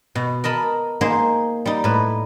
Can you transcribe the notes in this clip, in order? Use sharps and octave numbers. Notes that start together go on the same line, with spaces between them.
B2
A#4 D#5 A5 B5
A#3 D#4 G#4 C5
G3 D#4
A2 B4